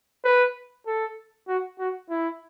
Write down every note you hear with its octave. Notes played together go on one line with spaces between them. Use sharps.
B4
A4
F#4
F#4
E4